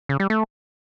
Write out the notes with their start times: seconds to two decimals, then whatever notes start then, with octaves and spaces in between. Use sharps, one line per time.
0.09 C#3
0.20 G3
0.30 A3